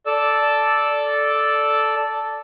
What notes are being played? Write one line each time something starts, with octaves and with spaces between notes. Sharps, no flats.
A4 D5 A5 E6